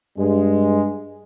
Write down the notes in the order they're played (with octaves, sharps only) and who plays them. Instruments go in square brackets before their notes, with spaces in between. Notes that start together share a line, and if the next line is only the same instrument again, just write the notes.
[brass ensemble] G2 G#3